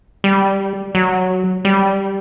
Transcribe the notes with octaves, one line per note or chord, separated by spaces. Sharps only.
G3
F#3
G3